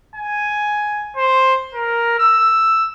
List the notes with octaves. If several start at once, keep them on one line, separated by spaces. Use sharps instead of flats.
G#5
C5
A#4
E6